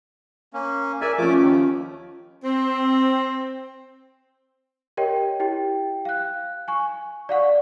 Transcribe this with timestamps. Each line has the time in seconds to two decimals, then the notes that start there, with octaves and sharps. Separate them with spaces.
0.53 A#3 C#4
1.01 A#4 D5 E5 G#5
1.18 F3 A3 C#4 D6
1.41 D#2 D#3
2.43 C4
4.97 G4 A#4 C#5 D#5 G5
5.40 E4 G4 G5
6.05 F5 F#6
6.68 G#5 C#6
7.29 D5 F5 F#5 C#6